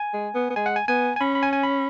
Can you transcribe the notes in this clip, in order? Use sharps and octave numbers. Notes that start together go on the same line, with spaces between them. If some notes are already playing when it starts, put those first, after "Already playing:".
Already playing: G#5
G#3
B3
B3
G#3 G#5
F#5
G#5
B3 G#5
G#5
C#4 B5
B5
G#5
G#5
B5